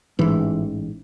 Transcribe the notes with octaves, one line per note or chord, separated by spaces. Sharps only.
A1 G#2 E3